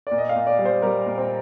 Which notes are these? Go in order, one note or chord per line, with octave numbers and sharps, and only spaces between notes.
A#2 D5
D#5
F5
A#2
D5
G3
C5
G3 A#4
A#2
C4